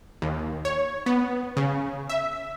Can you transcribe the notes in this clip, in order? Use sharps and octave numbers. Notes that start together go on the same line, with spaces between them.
D#2
C#5
B3
C#3
E5